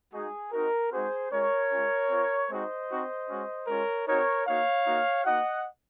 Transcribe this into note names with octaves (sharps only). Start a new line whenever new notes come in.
G#3 D#4 F#4 G#4
C4 D#4 F#4 A#4
G#3 C4 D#4 F#4 G#4 C5
G#3 C#4 F4 A#4 C#5
G#3 C#4 F4
C4 F4
G#3 C4 D#4 F#4 C5 D#5
C4 D#4 F#4
G#3 C#4 F#4
G#3 C#4 F4 A#4 C#5
C4 D#4 F#4 A#4 C#5
A#3 D#4 F#4 C#5 F5
A#3 D#4 F#4
A#3 D#4 F#4 D#5 F#5